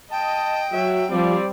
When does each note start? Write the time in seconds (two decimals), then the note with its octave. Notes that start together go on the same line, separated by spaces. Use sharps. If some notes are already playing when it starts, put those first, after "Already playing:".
0.12 D#5 G5 A5
0.73 F#3 F#4 E5
1.11 F3 G3 C4 D5